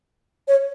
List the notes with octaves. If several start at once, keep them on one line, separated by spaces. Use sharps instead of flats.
C#5